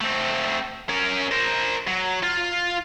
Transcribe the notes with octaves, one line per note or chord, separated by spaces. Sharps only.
A3 C4
C#4 A#4
A#4 C5
F#3
F4